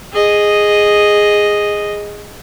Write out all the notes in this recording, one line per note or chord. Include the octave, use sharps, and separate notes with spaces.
G#4 D#5